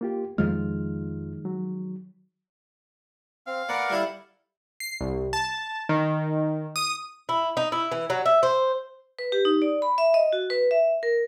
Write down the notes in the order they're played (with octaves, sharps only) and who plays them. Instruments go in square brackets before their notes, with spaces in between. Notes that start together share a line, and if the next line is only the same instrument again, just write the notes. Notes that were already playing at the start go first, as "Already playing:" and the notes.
[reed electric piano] A#3 F4 G4
[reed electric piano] F2 F4 F6 [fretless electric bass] D#3 F3 G#3
[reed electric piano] F#3
[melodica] C4 [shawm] F5
[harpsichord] B3 [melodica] A#4 D5 F#5
[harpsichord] G3 E4 A4
[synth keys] C7
C2
A5
D#3
D#6
[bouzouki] E4
D#4
E4
E3
F#3
E5
C5
[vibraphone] B4
G4
D#4
D5
B5
E5
D#5
F#4
B4
E5
A#4